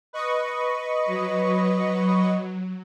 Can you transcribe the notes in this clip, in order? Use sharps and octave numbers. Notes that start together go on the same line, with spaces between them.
B4 D#5 C#6
F#3